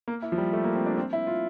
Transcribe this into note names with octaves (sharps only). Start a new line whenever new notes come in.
A#3
E4
F3
G3
A3
A#3
C4
D4
C4
E4
F4